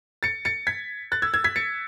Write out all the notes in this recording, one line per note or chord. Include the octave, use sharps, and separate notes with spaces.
A6 C#7
A6 C#7
G#6 B6
F#6 A6
E6 G#6
E6 G#6
G#6 B6
A6 C#7